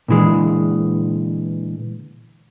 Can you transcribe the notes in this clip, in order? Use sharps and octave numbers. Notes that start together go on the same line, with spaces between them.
A#2 D3 E3 G#3